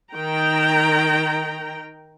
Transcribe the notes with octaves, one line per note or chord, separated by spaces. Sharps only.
D#3 G5 A#5